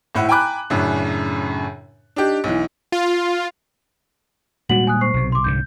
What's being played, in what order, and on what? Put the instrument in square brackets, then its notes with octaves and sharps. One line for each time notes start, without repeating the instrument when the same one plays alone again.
[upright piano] G#1 A2 E4 F#5
G5 G#5 A#5 B5 D6 F#6
F#2 A2 C#3 D4
D4 D#4 G4
B1 E3
[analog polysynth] F4
[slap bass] A#2 G3 G#3 [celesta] F#4 F#5 F#7
[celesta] G#5 D#6 F#6
C5 C#6 C7
[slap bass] B1 C3
[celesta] C6 D6
[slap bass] C2 G#2 D3 [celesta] G6